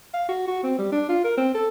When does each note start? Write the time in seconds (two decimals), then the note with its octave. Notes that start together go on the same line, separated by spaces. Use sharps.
0.14 F5
0.29 F#4
0.48 F#4
0.63 C4
0.79 G3
0.92 D4
1.09 F4
1.24 A#4
1.37 C4
1.54 A4